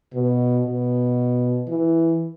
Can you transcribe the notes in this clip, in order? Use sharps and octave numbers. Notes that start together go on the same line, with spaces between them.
B2
B2
E3